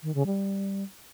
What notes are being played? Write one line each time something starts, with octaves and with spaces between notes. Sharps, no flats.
D#3
C#3
G3